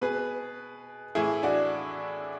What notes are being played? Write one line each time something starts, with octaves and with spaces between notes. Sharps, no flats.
B2 G#4 B4
A2 E3 E4 G#4
D4 F#4